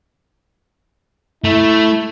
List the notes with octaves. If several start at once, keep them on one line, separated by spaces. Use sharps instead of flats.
A3 E4